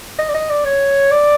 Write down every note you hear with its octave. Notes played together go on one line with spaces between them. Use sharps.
D#5
D5
D#5
D5
C#5
D5